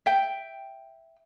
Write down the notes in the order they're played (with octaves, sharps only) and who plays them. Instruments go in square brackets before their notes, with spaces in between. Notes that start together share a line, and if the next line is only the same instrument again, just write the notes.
[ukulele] E5 G5